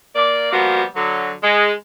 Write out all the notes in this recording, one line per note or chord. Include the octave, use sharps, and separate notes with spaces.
A#3 D5
F3 G3 A#3 B3 F#4
D3 F#3
G#3